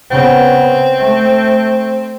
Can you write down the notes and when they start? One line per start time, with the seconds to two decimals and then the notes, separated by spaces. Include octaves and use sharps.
0.10 C#3 B3 C4
0.98 A3